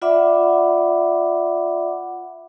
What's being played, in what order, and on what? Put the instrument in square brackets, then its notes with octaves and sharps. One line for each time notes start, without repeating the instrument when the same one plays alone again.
[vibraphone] F4 D5 E5 F#5 B5 D6